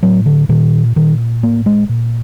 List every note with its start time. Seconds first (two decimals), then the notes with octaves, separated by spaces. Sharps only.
0.03 A2 F#3
0.26 D3
0.49 A#2 D#3
0.96 A#2 D#3
1.43 A2 A#3
1.66 G#3
1.89 A#2